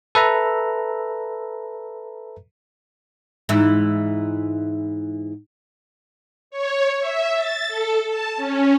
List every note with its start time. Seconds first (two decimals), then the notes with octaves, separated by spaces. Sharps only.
0.15 A4 B4 E5 A#5
3.49 G#2 E3 E4
6.51 C#5
7.00 E5
7.36 A6
7.67 A4
8.06 A5
8.37 C#4